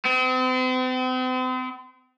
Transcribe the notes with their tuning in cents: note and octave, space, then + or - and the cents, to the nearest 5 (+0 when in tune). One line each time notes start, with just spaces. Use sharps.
C4 -40